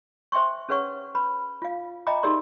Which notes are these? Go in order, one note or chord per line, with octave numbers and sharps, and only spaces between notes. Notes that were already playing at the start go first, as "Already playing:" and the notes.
C5 E5 G5 C6 C#6
C#4 G#4 B4 C#5 F#5 C#6
B4 B5
F4 F5
D#5 E5 G5 A#5 B5 D6
D#4 G4 G#4 A#4 D5 C6